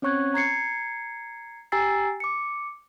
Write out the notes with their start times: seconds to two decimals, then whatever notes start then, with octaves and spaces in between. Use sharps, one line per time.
0.02 C4 C#4 C#5 C#6 F#6 G#6
0.34 A#5 G#6 C7 C#7
1.72 G4 G#5 A#5 E6 A6 C7
2.20 D6 C#7